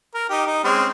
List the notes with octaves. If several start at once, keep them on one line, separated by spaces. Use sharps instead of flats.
A#4
D#4 G4
D#4
G#3 C4 C#4